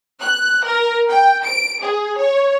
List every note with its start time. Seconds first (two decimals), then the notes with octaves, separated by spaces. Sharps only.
0.21 F#6
0.65 A#4
1.09 G5
1.44 D7
1.82 G#4
2.18 C#5